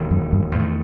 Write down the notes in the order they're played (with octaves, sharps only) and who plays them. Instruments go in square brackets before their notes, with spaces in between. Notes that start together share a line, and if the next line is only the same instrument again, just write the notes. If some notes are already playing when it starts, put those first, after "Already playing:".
Already playing: [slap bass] E1 D#2 D#3
[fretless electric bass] F#2
G2
[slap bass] E2 D#3 A3 [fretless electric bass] A2